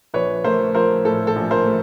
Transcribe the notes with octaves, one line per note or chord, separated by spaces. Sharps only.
A#1 B4 C#5
A3 A#4 C5
F3 A#4 C5
A2 A4
A4
A#1
A#4 C5
A3